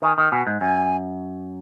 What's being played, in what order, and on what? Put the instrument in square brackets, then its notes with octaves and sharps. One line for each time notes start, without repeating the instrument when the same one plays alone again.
[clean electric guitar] D#3 [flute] G#5
[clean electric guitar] D#3
[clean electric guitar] B2 [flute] G#5
[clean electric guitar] G#2
[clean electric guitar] F#2 [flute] G#5